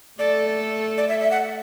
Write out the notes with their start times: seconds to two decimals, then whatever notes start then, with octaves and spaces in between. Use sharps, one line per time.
0.19 A3 A4 D5
0.98 D5
1.09 E5
1.21 E5
1.31 F#5